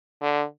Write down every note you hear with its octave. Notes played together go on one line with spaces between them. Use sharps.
D3